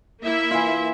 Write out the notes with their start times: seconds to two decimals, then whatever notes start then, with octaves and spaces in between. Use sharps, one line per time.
0.21 A#3 E4 E5
0.51 E3 F4